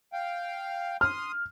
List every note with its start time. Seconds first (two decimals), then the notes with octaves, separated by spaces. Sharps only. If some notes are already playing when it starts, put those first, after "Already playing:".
0.13 F5 G5
1.01 C6 D#6 F6